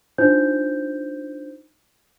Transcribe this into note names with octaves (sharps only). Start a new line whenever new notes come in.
D4 D#4 F4 C5 G6